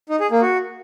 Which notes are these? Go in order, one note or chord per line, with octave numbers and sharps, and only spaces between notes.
D#4
G#4
A#3
F#4